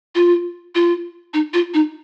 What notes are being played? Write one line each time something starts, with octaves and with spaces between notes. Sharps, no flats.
F4
F4
D#4
F4
D#4